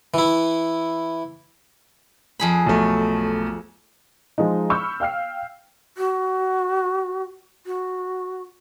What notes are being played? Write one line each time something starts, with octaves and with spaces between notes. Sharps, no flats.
E3 E4
F2 G#4 B5
B1 A3
F3 G#3 D#4
B5 C#6 E6 F6 G6
F5 G5 F6 C7
F#4
F#4